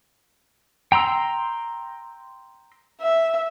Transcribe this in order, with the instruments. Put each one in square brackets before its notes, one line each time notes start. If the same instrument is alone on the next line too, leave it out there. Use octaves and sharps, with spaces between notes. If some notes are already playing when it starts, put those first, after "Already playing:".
[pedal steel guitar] G5 A#5 C6 E6
[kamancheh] E5